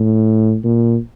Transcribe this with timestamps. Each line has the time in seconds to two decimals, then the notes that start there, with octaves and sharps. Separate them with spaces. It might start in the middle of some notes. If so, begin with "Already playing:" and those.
Already playing: A2
0.64 A#2